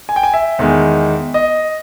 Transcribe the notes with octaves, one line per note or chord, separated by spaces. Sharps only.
G#5
G5
G#5
E5
E2 D#3 G#3
D#5